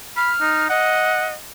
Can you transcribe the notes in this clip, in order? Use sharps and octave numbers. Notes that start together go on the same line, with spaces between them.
B5 F6
D#4
D#5 F#5